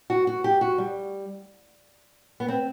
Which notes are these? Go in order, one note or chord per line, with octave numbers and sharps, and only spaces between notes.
F#4
F#4
G4
F#4
G3
B3
C4